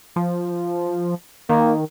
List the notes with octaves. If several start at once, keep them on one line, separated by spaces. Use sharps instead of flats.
F3
D#3 A#3